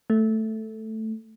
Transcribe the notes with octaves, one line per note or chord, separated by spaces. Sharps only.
A3